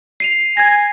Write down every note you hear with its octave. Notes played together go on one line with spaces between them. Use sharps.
C7 D#7 F7
G#5 G#6 A#6